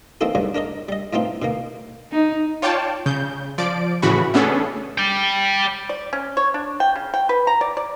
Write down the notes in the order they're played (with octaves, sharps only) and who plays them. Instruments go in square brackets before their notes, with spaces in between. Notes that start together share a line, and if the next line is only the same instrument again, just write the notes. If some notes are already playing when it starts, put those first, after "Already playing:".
[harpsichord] E3 A#3 C4 D#4 F#4 A4
B1 G2 C#3 F#3
D4 A#4 C#5 D#5
G3 D#5
A2 A3 B3 C4 D#4 F4
B2 D#3 A#3
[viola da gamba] D#4
[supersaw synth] F4 C#5 D5 G5 A5
C#3 G6
F3 D5 D7
A2 C#3 E3 F#4 B5 C#6
A3 B3 C#4 D4 G#4 A4
[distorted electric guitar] D5 G5
[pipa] D5
C#4
C#5
D4
G5
C#3
G5
B4
A#5
D5
D5